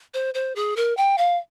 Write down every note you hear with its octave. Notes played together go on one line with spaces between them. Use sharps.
C5
C5
G#4
A#4
G5
F5